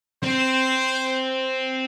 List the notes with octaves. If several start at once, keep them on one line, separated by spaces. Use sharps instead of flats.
C4 C5